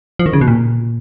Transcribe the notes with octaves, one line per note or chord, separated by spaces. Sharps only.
F3
D#3
C#3
B2
A#2